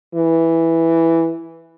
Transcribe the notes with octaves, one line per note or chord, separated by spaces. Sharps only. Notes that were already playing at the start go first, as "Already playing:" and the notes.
E3